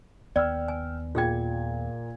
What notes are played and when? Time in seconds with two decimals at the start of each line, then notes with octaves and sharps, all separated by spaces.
0.36 D#2 B3 D5 G5 E6 F6
0.68 G#5
1.15 A#2 F4 G#4 G5 G#6